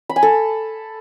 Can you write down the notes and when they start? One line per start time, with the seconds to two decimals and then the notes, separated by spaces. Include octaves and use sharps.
0.09 B5
0.16 G#5
0.23 A4